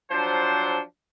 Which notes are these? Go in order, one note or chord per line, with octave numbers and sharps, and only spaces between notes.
F3 F#3 D4 C5